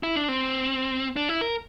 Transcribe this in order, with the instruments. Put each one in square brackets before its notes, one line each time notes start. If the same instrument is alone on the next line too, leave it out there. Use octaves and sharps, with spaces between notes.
[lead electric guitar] E4
D4
C4
D4
E4
A#4